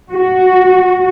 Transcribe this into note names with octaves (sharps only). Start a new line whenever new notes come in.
F#4